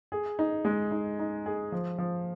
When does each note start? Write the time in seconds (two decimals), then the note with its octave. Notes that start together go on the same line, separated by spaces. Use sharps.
0.12 G#4
0.39 D#4
0.65 G#3
0.91 D#4
1.19 D#4
1.46 G#4
1.72 F3
1.98 F3